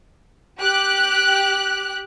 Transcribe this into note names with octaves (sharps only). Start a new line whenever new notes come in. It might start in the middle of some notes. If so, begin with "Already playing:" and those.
G4 F#6